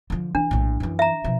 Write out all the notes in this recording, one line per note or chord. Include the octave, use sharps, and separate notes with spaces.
D3 F3
E3 D4
A#1 A2
F#2 E3
E5 A#5
B2 F3